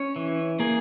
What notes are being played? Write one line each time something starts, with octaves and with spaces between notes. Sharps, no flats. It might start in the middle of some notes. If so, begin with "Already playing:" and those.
Already playing: C#4 C#5
E3
A#3 G#4